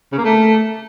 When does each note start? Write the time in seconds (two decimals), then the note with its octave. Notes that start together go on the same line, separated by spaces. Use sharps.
0.12 C#3
0.18 A#3
0.24 A3